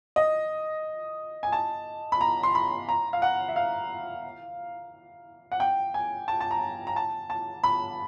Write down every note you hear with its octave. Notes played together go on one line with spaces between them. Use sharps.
D#5
G#5
A5
B5
A#5
C6
B5
A#5
F5
F#5
E5
F5
F#5
G5
G#5
A5
A5
A#5
A#5
A5
A5
B5